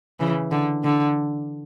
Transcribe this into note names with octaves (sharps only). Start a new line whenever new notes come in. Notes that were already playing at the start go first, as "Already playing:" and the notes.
C#3 E3
D3
D3